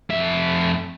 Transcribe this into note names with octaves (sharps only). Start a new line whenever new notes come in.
F2 E5